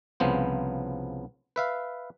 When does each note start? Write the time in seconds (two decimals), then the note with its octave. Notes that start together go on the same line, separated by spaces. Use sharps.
0.20 C2 C#3 F3 B3 C5
1.56 B4 E5 F5